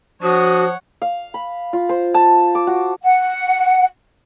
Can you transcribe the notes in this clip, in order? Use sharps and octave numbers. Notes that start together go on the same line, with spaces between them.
F3 D4 F#4 C#5 F#5 D#6
F5
B5
F4
C5
A5
D6
F#4
F#5